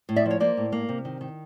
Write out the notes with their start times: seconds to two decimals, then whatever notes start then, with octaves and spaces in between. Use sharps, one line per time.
0.09 A2
0.16 D5 E5
0.25 F3
0.31 C#5
0.40 A#3 C5 D5
0.57 A2
0.72 A#3
0.89 C3
1.05 D#3
1.21 D#3